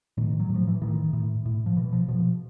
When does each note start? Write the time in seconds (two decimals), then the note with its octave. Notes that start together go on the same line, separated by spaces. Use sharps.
0.17 A2 D#3
0.40 F#3
0.49 A2
0.54 F3
0.67 E3
0.81 A2 D#3
1.13 A2
1.45 A2
1.66 F3
1.77 B2 E3
1.93 F3
2.08 B2 F3